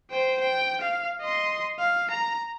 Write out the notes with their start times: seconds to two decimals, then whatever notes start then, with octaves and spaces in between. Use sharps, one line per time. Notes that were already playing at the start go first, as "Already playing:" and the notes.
0.11 C5 G5
0.41 G5
0.82 F5
1.21 D#5 C6
1.79 F5
2.11 A#5